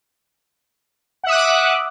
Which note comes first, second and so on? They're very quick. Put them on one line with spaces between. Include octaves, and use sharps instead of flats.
F#5 E5 D#6 F#6 D6